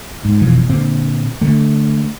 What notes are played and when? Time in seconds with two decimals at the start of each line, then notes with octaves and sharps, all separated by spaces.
0.25 G#2
0.42 F1 B2 E3 F3
0.70 A#2 D3 C4
1.41 D3 A3